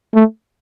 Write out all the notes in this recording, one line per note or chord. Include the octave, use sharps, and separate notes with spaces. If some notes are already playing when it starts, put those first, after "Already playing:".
A3